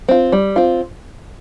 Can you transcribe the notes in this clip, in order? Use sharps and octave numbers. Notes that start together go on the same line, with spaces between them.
C4 F4
G3
C4 F4